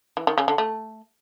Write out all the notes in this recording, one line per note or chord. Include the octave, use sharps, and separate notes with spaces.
E3
D#3
C#3
D3
A3